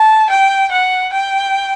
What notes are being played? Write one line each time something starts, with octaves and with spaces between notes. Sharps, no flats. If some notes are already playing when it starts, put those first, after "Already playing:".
Already playing: A5
G5
F#5
G5